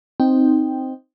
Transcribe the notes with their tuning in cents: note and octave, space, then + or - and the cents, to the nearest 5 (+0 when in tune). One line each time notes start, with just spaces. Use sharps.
C4 +0 D#4 +0 G5 +0